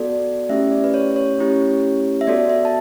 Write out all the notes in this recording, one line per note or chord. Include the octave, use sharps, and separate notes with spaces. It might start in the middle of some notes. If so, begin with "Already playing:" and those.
Already playing: B3 F#4 A4 D5
A3 C#4 E4 G4 E5
D5
B4
C#5
C#5
A3 C#4 E4 G4
E5
B3 F#4 A4 D5
E5
A5